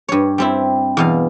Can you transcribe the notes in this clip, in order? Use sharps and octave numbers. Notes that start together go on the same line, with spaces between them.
G2 C#5
G3 C4 E4
E2 B2 F5